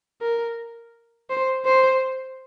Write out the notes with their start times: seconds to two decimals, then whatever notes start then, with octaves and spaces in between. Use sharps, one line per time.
0.21 A#4
1.30 C5
1.65 C5